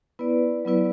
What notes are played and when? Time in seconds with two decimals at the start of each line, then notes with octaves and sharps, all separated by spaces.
0.19 B3 E4 B4 D5
0.65 F#3 B3 E4 B4 D5